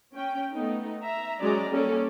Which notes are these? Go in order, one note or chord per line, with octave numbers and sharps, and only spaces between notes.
C#4 G5
A3 B3 D#4
E5 A#5
F#3 G#3 C#4 D5 A#5
G3 A#3 C#4 A4 C#5 D5